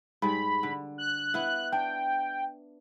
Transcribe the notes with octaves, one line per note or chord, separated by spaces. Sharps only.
G#2 G3 B5
D3
F#6
B3 E4
D4 G5